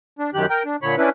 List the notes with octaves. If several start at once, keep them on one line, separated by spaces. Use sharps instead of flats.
D4
F#2 D#3 G4 F#6
A#4 G5
D4
A#2 D3 C#5 B5
C#4 D4 E4 B4